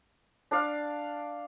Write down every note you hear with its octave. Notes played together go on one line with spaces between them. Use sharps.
D4 D5 F5